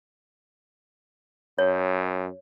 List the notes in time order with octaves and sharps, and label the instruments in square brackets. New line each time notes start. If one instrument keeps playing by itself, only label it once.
[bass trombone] F#2 [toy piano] C#5